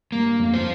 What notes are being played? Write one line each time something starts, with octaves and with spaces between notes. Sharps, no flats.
G2 A#3
F2
F4 C5